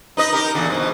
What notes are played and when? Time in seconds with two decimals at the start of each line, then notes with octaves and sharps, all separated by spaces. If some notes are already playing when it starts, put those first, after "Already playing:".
0.17 D#4 B4 D#5
0.33 D#4 G4 A#4
0.54 E2 A#2 D3
0.70 G#2 B2